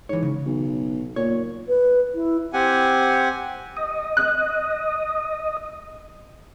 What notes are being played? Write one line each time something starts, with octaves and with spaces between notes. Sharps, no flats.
G#2 E3 C#5
C#3
B1
A#2 C#5
B4
E4
C4 G4 F#5 G#5
D#5
F#6